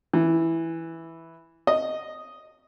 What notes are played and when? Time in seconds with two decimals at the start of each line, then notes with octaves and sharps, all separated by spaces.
0.13 E3
1.67 D#5